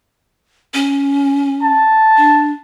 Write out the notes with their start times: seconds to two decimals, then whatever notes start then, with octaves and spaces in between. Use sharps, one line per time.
0.74 C#4
1.63 A5
2.17 D4